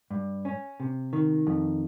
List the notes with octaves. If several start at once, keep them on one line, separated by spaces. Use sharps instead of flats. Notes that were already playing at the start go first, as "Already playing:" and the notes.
G2
C#4
C3
D#3
F2